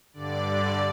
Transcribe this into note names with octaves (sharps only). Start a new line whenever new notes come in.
G2 D3 D5
D5